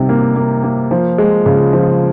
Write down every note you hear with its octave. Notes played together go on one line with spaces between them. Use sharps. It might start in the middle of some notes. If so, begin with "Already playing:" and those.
Already playing: C3 D#3 G3
A#3
A#3
A#3
F3
G#3
C#3
F3